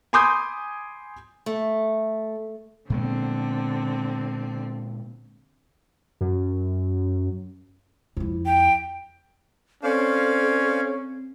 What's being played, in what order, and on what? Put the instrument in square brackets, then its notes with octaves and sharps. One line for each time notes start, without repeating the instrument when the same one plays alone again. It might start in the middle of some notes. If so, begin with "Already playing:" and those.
[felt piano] G#5 B5 C6 D6 D#6 G6
[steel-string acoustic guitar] A3
[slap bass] A#2 G#3 B3 [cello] D3 C4
[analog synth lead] F#2
[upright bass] F2 E4
[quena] G5
[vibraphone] C4 [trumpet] C#4 [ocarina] A4 [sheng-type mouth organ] C5 D5 F5